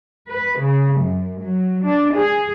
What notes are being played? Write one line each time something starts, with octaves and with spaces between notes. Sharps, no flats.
B4
C#3
F#2
F#3
D4
G#4